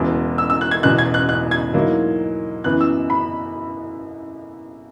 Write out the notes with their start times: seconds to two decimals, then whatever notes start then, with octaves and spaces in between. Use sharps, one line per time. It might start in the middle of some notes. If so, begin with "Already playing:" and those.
Already playing: E1 E2 C#3
0.38 E6
0.50 E6
0.61 F#6
0.71 G#6
0.83 E1 E2 B2 F#6
0.98 G#6
1.14 F#6
1.29 F#6
1.51 G#6
1.73 G#2 F#3 A#3 E4
2.64 F#2 E3 B3 E4 F#6
2.81 E6
3.10 B5